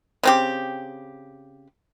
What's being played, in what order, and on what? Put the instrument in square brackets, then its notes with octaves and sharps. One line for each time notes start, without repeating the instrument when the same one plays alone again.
[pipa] C#3 C4 G4